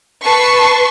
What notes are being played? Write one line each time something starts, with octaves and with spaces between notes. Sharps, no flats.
B4 A5 C#6 C7